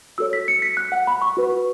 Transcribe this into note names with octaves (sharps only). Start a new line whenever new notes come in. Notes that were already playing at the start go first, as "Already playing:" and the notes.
F#4 A4 C#5 E6
B6
C#7
B6
F#6
F#5
B5
C#6
F#4 B4